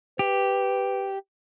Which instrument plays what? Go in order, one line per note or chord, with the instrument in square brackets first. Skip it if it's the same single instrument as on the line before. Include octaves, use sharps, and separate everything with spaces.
[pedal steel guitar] G4 [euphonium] B4